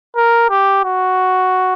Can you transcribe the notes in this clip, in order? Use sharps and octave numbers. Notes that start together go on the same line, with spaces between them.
A#4
G4
F#4